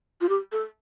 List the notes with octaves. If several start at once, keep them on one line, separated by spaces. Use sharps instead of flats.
F4
G4
A4